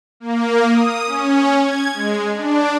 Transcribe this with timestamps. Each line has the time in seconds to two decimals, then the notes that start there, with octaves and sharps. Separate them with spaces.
0.20 A#3
0.68 D#6
1.05 C#4
1.57 G#6
1.94 G#3
2.35 D4